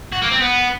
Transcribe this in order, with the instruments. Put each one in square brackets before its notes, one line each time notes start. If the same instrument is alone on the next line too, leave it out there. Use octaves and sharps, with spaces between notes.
[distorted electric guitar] F#4
A#3
C4
B3